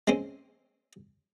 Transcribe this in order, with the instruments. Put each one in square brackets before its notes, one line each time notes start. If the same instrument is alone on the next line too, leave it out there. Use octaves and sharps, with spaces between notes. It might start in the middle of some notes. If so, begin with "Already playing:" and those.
[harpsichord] G#3 C4 C#4